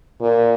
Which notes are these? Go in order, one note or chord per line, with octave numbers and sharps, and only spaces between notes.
A#2